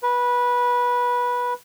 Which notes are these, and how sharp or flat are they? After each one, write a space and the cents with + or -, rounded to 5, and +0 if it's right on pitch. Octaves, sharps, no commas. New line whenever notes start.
B4 -15